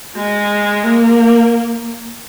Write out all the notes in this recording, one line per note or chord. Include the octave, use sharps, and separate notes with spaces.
G#3
A#3